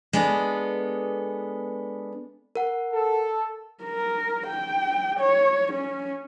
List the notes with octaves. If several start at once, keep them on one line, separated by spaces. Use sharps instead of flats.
G#3 B3 D4 A4 B4
A#4 F#5
A4
A#4
G5
C#5
C#4